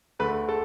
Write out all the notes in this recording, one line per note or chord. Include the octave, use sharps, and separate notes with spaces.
D2 D3 A3 B4
A4